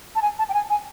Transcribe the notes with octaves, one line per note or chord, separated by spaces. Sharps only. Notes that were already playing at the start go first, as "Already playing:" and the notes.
A5
G#5
A5
G5
G#5
G#5